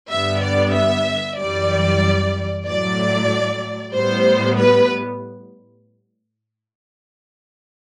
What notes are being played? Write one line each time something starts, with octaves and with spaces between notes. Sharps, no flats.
G2 D3 G3 B3 E5
D5
E5
F#2 E3 G3 D5
A2 F#3 A3 D5
A2 G3 B3 C5
B4